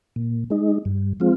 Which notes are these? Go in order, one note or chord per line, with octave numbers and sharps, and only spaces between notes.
A#2
G#3 D#4
G2
F3 G#3 C4 F4